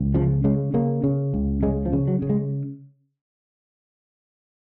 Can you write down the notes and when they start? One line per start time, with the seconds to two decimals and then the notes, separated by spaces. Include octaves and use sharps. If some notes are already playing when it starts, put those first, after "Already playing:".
Already playing: C#2
0.14 C#3 F3
0.44 C#3 G#3
0.74 C#3 A#3
1.04 C#3
1.34 C#2
1.63 C#3 G#3
1.86 F3
1.93 C#3
2.08 F#3
2.22 C#3
2.30 G#3